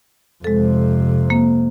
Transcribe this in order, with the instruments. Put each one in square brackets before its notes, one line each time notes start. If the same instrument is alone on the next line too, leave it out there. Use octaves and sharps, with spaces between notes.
[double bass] F2 C3 [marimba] G#3 A4
[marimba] A#3